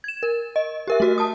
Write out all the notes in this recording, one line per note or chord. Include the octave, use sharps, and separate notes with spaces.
G#6 E7
A#4
D#5
G4 A#4 E5
A3 F#4 A#4
A5 D#6